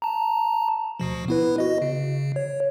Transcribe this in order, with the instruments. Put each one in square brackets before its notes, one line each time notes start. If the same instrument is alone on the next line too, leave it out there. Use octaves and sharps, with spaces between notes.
[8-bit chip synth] A5 A#5
D2 B2 F3
B3 E4 B4
F#4 D#5
C#3
C#5